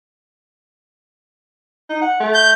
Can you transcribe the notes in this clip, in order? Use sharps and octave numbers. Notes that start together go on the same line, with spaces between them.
D#4
F#5
A3
G6